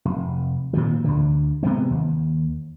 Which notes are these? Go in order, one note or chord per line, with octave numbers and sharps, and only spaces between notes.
F1
A#2 D#3 F3
D2 D3
C3 G#3 B3 C4
D#2